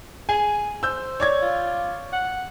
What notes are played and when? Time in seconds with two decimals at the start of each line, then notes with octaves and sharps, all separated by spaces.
0.29 G#4 G#5
0.83 C5 E6 G6
1.20 C#5 D5 G#6
1.42 F4
2.13 F#5